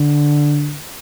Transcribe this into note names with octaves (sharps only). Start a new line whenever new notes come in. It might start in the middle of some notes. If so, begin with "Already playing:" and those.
Already playing: D3